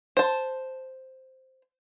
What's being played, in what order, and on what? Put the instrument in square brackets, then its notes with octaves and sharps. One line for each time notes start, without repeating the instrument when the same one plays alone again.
[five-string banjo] C5 A5